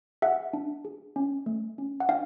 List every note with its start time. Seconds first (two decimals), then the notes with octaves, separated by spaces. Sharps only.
0.22 G#4 E5 F#5
0.53 D4
0.85 G#4
1.16 C#4
1.46 A3
1.78 C#4
2.00 F#5
2.09 D4 F5 G5